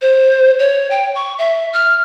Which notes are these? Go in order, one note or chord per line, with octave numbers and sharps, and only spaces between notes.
C5
C#5
G5
C#6
E5
F6